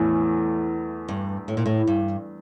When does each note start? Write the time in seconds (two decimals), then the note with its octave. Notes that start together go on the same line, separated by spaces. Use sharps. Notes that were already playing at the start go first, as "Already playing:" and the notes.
Already playing: E2 A2 E3 A3
1.08 G2
1.48 A2
1.57 A#2
1.66 A2
1.87 G2